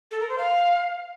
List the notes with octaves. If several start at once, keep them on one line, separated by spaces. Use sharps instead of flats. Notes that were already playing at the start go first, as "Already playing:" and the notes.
A4
A#4
C5
F5